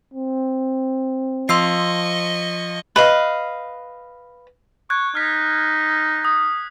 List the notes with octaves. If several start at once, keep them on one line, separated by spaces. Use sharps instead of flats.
C4
F3 D#5 C6 C#6 E6 C7
B4 D#5 F5
C#6 F#6 G#6
D#4 F6 B6
D#6